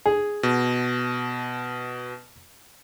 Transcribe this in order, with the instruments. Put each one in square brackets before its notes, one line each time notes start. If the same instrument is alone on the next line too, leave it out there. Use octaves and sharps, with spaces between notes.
[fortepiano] G#4
[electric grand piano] B2